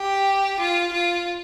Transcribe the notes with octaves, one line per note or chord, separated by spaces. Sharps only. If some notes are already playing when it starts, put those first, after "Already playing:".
Already playing: G4
F4
F4